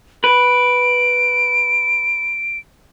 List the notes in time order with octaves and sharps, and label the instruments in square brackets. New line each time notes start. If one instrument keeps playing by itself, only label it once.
[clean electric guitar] B4 [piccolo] D7